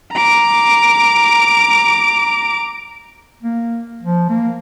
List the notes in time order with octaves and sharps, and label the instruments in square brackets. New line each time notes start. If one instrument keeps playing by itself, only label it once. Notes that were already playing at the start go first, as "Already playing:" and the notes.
[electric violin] A#5 D6
[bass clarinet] A#3
F3
A#3